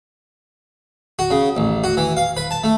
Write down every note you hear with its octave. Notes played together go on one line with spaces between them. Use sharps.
F#4
C#3
A1
F#4
E3
F5
B4
A5
A3